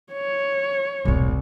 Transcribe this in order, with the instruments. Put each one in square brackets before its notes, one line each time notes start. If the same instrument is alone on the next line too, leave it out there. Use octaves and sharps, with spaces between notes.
[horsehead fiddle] C#5
[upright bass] E1 A2 [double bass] C2